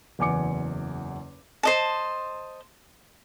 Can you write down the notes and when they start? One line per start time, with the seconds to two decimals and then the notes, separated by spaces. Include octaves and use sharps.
0.19 F#1 E2 G#5 D6 C#7
1.63 C5 D#5 A5